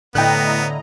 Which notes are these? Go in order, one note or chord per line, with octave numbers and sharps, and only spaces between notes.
A2 D3 B3 E4 D#5 G5 A#5 F#6